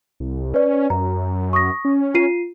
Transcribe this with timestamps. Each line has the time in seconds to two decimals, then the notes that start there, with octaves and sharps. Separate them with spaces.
0.20 C2
0.54 C#4 B4 D5
0.90 F#2 A#5
1.53 C#6 D#6 A#6
1.85 C#4
2.15 F4 C7 D#7